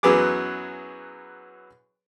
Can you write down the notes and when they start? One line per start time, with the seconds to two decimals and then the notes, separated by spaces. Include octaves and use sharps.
0.03 F#2 E3 F#3 B3 G#4 D6